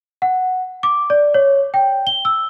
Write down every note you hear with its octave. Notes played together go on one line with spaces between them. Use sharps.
F#5
D6
D5
C#5
G5
G7
E6